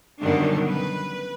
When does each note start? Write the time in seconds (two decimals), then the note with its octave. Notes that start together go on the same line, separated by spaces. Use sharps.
0.20 F#2 B2 D3 D#3 G3 D4
0.68 B4